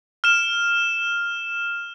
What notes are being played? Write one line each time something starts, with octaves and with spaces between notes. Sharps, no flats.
F6 E7